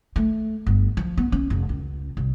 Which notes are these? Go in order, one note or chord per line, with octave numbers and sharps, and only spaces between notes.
A3
G1
F3
B3
C#4
F1
C#2
C2